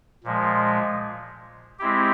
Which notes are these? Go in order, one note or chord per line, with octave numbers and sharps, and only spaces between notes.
A#2 F3 G#3
G#3 C4 E4 G4